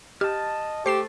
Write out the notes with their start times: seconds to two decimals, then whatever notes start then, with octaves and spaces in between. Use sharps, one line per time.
0.21 G4 D#5 A5 F6
0.86 A3 G4 C5 C7 E7